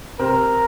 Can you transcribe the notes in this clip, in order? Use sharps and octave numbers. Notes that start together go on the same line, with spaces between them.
C3 C4 A#4